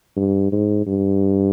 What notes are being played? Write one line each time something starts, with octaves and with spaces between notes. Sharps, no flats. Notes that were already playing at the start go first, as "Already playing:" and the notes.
G2
G#2
G2